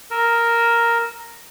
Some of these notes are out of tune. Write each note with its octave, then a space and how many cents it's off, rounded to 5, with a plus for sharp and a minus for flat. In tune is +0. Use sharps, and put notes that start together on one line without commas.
A#4 +0 E6 -20